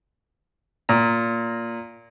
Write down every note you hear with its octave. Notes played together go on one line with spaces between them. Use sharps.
A#2 A#5